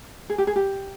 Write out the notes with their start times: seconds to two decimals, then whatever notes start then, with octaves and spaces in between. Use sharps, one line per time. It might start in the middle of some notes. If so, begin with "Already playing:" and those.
0.30 G#4
0.38 G4
0.47 G#4
0.56 G4